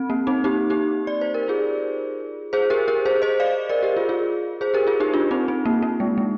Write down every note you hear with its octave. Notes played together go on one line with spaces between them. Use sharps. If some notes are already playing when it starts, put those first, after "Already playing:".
Already playing: C4
A#3
C4 D#4
D#4 G4
D#4 G4
D5
C5
A#4
F4 G#4
G#4 C5
G4 A#4
G4 A#4
G#4 C5
C5 D#5
D5 F5
A#4 D5
G4 A#4
F4 G#4
F4 G#4
G#4 C5
G4 A#4
F4 G#4
D#4 G4
D4 F4
C4 D#4
C4
A#3
A#3
G#3
G#3